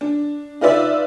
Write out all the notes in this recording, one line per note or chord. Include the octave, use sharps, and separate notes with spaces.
D4
D#4 F4 B4 D5 E5